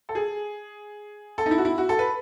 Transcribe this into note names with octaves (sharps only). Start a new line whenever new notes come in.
A4
G#4
A4
D#4
E4
F#4
E4
F#4
A4
B4